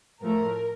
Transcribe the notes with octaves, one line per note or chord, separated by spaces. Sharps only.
A2 F3 A3 A#4